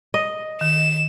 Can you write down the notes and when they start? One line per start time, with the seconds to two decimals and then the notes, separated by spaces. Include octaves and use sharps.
0.14 D#5
0.61 D#3 E7